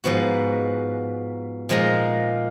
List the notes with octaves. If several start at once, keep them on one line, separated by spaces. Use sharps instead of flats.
G#2 F3 B3 F#4
A#2 F3 G#3 D#4 A#4